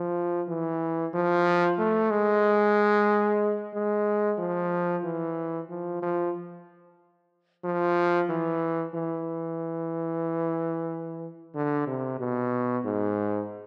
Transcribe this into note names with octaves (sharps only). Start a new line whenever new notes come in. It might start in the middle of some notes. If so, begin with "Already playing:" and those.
Already playing: F3
E3
F3
A3
G#3
G#3
F3
E3
F3
F3
F3
E3
E3
D3
C3
B2
G#2